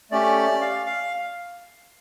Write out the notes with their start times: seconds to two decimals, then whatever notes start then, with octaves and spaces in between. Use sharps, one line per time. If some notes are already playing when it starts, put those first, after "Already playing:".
0.11 A3 C#4 G4 D5
0.61 F5
0.86 F5